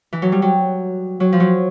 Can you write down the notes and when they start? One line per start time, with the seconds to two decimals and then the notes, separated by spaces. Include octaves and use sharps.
0.13 E3
0.22 F#3
0.32 G3
0.42 F#3
1.20 F#3
1.32 F3
1.40 F#3